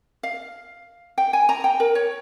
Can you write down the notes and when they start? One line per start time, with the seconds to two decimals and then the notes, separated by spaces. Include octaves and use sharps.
0.23 F5
1.18 G5
1.33 G#5
1.49 A#5
1.64 G5
1.80 A#4
1.95 C#5